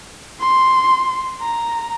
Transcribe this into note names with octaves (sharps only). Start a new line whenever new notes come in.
C6
A#5